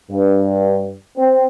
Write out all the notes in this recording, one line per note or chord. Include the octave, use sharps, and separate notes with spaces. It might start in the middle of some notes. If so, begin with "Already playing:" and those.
G2
C4